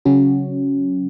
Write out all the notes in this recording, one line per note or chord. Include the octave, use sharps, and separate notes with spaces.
C#3 F#3 C#4 F#4